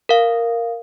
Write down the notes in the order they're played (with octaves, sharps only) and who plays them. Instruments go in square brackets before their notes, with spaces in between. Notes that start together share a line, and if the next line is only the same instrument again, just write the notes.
[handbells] A#4 F5